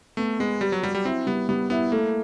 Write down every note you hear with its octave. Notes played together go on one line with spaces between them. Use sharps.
A3 B3
G#3 B3
G3 G4
F#3
F#3 G3
G3
C4 E4
G3 B3
G3 B3
B3 E4
A3 A#3